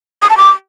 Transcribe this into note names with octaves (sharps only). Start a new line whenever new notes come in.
D#6
A5
D6